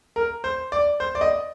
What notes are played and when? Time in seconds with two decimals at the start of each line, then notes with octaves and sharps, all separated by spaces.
0.16 A#4
0.44 C5
0.72 D5
1.00 C5
1.15 D5
1.21 D#5